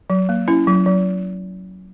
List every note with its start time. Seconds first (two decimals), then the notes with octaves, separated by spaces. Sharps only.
0.10 F#3
0.29 A#3
0.48 C#4 E4
0.67 F#3
0.86 F#3